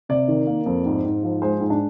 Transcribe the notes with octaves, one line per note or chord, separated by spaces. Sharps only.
C3 D5
D#3
A#3
F2
G#2
G#2
F3
G#3 C5
G#2
D4